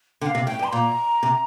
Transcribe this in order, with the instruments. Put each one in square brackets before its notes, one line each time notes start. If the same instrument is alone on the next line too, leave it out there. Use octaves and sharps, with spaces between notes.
[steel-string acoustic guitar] D3 [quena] G5
[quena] F5
[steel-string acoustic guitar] C3
[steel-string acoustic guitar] A2 [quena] G5
[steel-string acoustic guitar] G2
[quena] C6
[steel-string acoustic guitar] A#2 [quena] A#5
[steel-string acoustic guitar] C3